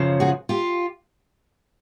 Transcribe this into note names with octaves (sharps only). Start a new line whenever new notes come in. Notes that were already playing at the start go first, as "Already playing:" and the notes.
Already playing: F#2 C#3 F3
F#4 G#4
F4 G4